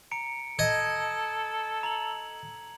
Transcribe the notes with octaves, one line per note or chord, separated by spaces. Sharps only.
A#5 C#7 D7
A4 D#5 G#6
A#5 F#7